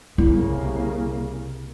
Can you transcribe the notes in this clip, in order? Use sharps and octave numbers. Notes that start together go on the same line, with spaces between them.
C2 C#3 A#3 E4